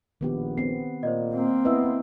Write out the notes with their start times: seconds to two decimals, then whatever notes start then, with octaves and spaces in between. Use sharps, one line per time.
0.21 A#1 D#3 B3 G4
0.58 B3 C4 C7
1.03 A#2 C5 D5 D#5
1.34 A#3 C4
1.65 B3 E4 B4 D#5 E5 E6